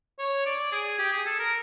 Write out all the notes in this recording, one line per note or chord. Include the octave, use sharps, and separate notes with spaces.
C#5
D5
G#4
G4
G#4
A4
A#4